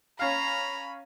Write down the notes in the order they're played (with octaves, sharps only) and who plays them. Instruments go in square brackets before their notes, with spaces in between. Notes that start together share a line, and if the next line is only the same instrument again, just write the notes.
[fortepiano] C#4 F5 [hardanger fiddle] A#5 [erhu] B5